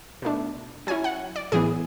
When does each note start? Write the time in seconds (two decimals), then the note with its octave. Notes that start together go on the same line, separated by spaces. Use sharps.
0.22 B2 A3 D4
0.87 F#3 C#4 E4 G#5
1.04 F#5
1.36 D5
1.52 A2 E3 B3 G#4